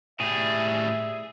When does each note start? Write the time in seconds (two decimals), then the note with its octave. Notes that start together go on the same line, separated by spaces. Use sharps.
0.20 A2 G3 G#4 E5